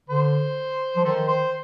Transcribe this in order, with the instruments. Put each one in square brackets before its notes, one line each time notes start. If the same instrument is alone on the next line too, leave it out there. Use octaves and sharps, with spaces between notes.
[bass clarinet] D3 [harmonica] C5
[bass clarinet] F3
[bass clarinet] D#3 [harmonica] A4 C5
[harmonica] C5